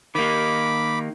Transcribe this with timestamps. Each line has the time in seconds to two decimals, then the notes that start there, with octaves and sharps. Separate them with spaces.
0.15 D#3 A#3 B5 D6